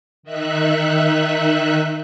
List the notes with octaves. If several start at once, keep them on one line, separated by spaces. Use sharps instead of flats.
D#3 D#4 E5 F#6